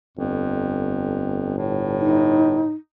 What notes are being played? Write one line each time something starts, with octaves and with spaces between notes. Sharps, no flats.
G1 F2
A2
D#4